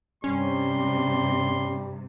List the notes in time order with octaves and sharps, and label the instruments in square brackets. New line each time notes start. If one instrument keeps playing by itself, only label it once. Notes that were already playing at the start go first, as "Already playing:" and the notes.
[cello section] G2 C3 [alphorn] G3 [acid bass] C#4 [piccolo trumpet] C6